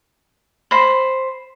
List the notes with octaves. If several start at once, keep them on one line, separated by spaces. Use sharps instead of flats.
C5 B5